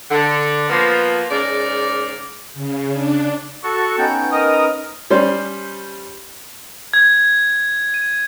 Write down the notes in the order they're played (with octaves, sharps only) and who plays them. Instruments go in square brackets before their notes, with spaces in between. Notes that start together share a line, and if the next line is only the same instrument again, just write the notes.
[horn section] D3
F3 A#3 B3
G#2 C#3 A#4 D5
[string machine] C#3
D4
[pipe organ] F#4 A4 [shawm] C#6
[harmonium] B3 C#4 D#4 [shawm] G5
[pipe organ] A#4 D#6 [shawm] D#5
[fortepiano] G3 C#4 C5 D5
[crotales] G#6
D#7